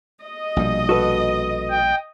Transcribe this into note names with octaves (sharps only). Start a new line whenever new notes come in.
D#5
A#1 B2 G3
F#4 A4 B4
G5